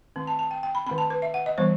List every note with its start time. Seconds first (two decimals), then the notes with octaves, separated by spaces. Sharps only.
0.16 D#3 A3 C4
0.27 A5
0.39 A5
0.51 G5
0.63 G5
0.75 B5
0.86 D#3 A3 C4 B5
0.98 A5
1.10 B4
1.22 E5
1.34 F#5
1.46 D#5
1.58 E3 G3 B3 C5